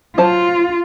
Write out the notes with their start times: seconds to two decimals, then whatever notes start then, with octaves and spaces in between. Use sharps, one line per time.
0.18 F#3 F4 C5 A5